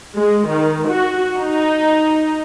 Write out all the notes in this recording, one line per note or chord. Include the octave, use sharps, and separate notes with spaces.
G#3
D#3
F#4
D#4